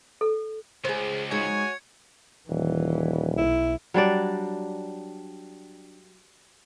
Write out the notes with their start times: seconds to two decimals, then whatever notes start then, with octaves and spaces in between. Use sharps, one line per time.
0.21 A4
0.85 C#2 G#4 C5
1.31 G#3 D#4 F#4 C#5 G#5 G#6 C#7
2.49 D#1 E3
3.37 B1 E4
3.94 F#3 G3 D4 D5